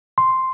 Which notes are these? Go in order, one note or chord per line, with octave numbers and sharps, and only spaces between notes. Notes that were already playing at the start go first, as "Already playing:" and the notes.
C6